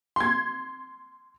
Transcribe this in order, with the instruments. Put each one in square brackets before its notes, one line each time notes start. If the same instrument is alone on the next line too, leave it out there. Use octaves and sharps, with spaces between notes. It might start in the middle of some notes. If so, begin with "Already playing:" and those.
[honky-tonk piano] C6 G#6